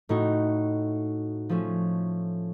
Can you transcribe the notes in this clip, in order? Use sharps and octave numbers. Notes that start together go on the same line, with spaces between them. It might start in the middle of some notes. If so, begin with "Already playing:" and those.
A2 A3 D#4 F#4
F3 A3 C#4